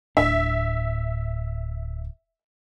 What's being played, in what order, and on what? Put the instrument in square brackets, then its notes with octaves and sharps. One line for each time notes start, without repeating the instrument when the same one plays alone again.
[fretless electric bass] D1 A2 D4 [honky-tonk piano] E5